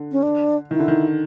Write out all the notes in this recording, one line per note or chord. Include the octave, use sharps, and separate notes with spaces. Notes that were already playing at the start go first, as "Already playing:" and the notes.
Already playing: D3
C#4
D4
D#3 E4
D3
D#3